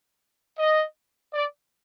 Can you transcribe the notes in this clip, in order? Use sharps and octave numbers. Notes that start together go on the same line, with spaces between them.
D#5
D5